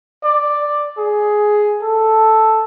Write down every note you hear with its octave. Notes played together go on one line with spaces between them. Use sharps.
D5
G#4
A4